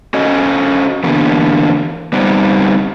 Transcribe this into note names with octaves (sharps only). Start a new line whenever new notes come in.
C#4 F#4 A4 D#5
D3 E3 A#3 B3 G4
G3 B3 C4 D#4 G4